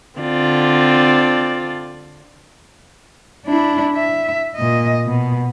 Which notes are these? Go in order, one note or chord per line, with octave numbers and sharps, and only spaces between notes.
D3 C4 F4 D5
D4 E4
E5
A#2 D#5
B2